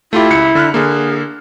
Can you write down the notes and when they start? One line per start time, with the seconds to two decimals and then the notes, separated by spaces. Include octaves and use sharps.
0.13 A3 E4 F4 G4
0.30 C#2 C#7
0.55 D3 F6 F#6
0.74 D3 A#3 G#4